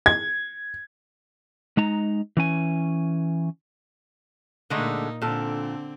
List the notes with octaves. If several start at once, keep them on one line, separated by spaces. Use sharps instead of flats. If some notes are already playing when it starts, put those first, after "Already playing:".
G#6
G#3 D#4 A#5
E3 C#4 G#5
A#2 D3 G#3 A3 D#4
A#2 D3 C4 A4